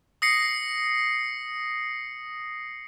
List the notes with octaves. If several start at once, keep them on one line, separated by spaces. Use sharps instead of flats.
D#6 A#6 C7 C#7